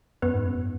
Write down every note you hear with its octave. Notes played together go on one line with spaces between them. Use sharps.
F#2 B3 B4
G#2
F#2